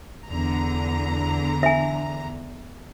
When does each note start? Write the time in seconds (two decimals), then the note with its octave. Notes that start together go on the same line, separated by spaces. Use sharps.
0.28 E2 D3 A#5
1.63 E5 G#5